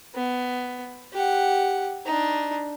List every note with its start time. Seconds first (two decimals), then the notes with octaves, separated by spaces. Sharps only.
0.14 B3
1.12 G4 F#5
2.06 D4 D#4